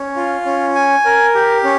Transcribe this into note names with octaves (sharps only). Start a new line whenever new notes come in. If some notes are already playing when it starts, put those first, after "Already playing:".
Already playing: C#4
F4
C#4
G#5
A#4
G4
C#4